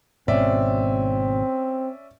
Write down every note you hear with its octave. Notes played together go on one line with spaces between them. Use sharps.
G#1 G#2 B2 C4 C#4 D5 E5